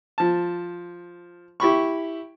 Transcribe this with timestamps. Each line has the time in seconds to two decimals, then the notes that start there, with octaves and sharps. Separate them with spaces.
0.18 F3 A5
1.60 E4 G4 B5 C#6